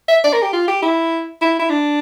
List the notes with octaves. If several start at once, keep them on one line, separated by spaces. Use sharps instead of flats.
E5
D5
A#4
G4
F4
G4
E4
E4
E4
D4